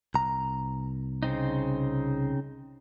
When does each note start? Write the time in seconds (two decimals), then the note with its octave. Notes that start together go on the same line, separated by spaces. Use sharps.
0.14 C2 A#5
1.23 C#3 C4 D#4